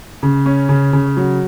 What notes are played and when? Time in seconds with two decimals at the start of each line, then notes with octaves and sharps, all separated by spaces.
0.23 C#3
0.46 C#4
0.69 C#3
0.93 C#3
1.17 F#3